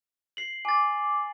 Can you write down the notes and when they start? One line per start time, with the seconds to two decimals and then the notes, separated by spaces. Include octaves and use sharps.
0.37 C7 F#7
0.65 G#5 D6 A6